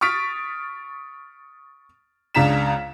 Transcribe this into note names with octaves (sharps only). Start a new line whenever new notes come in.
C#6 D#6 F6 A6 B6 D7
C#2 C#3 D4 A#5 B6 E7